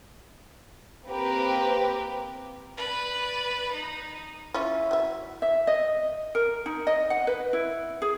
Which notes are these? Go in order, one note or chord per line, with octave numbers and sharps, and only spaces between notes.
A#3 C4 G4 A#4 B4
B4 D5
D#4
C#4 E4 F4
F#3 E5
E5
D#5
A#4
D#4
D#5
F#5
B4
E4
G#4